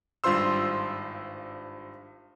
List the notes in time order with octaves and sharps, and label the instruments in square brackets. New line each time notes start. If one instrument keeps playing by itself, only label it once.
[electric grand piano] G#1 G2 F4 C5 C6 E6